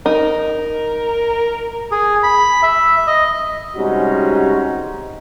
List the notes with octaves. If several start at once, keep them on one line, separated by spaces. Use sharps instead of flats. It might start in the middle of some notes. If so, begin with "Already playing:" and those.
D#4 A#4
G#4
B5
E5
D#5
C3 G3 G#3 C#4 D#4 F#4